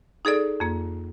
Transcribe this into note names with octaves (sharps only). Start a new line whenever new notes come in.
D#4 G#4 A4 D5
F2 A#3